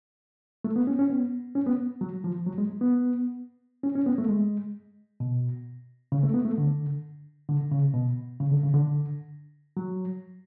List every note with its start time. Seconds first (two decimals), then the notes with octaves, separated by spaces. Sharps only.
0.64 A3
0.76 B3
0.87 C#4
0.99 C#4
1.10 B3
1.55 C#4
1.66 B3
2.01 F#3
2.24 F3
2.47 F#3
2.58 G#3
2.81 B3
3.83 C#4
3.95 C#4
4.06 B3
4.18 A3
4.29 G#3
5.20 B2
6.12 C#3
6.23 A3
6.34 B3
6.45 A3
6.58 D3
7.49 D3
7.71 C#3
7.94 B2
8.40 C#3
8.52 D3
8.63 C#3
8.74 D3
9.77 F#3